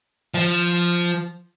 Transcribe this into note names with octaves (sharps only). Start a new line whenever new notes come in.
F3